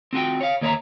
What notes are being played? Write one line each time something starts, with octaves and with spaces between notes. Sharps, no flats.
C4 F4 F#4 G5
C#5 F5
D#2 A#3 C#5 D#5 E5 A#5